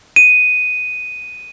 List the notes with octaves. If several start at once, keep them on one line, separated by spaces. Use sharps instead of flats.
D#7